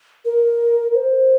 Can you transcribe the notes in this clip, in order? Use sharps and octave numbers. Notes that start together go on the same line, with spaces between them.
A#4
C5